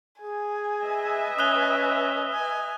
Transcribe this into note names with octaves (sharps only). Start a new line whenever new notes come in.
G#4 G#5
B4 D#5 E5
C#4 D#6 F#6 G7
G#5